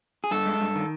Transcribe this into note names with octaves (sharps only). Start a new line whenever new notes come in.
G#4
G2 A4
G#3
G2
D#3